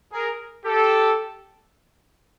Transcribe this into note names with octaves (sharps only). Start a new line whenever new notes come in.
G#4 A#4
G4 A4